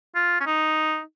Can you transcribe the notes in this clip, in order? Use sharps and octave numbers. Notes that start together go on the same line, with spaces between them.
F4
C#4
D#4